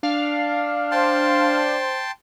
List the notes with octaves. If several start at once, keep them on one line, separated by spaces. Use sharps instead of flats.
D4 F5
C5 G5 A5 C6